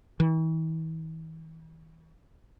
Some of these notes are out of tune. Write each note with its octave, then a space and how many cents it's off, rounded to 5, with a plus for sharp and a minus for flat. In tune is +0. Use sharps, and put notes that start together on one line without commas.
E3 -45